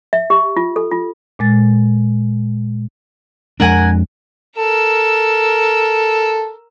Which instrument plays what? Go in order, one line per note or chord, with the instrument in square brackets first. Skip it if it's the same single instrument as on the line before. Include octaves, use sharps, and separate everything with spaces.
[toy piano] E5
G4
F4
A4
F4
[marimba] A#2 G#3 A6
[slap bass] F2 G#3 D4 [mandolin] A#4 F#5 G#5
[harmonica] A4 [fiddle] A#4 E6